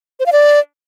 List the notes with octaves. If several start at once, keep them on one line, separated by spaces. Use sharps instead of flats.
C5
F5
D5